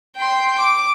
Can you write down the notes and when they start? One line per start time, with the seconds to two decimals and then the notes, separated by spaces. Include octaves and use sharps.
0.17 G5 C6
0.59 D6